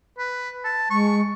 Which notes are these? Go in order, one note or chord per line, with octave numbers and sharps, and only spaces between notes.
B4
A5
G#3 C#6